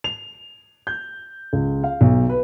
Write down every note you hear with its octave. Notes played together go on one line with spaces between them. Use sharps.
F7
G6
C#2
F5
B1
B4